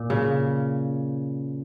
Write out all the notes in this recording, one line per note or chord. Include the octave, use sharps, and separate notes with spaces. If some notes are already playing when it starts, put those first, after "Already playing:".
Already playing: A#2
C#3